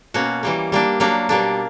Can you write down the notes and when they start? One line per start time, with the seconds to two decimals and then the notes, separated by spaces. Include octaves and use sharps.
0.14 B2 A#3 C#4 F#4
0.43 E3 G3 A#3
0.72 G3 A#3 D4
1.00 F#3 A#3 D4
1.29 B2 G3 A#3 D4